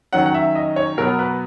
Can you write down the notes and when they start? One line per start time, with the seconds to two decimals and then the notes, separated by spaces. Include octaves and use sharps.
0.13 D#3 F#3 C#4 F#5
0.26 F#5
0.34 E5
0.55 D#5
0.76 C#5
0.97 B2 F#3 B3 A#4
1.19 B4